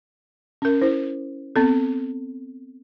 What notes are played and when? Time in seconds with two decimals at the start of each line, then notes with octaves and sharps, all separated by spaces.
0.62 C#4 A#4
0.81 E4 C5
1.56 B3 C4 A4